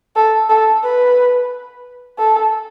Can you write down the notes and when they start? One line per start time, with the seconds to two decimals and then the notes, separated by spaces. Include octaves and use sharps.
0.16 A4
0.49 A4
0.83 B4
2.19 A4